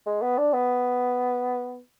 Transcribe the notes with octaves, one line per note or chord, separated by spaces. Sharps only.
G#3
B3
D4
B3